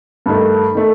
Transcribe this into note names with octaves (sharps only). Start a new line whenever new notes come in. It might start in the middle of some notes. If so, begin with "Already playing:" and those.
G2 D#3 A3
D#3 A3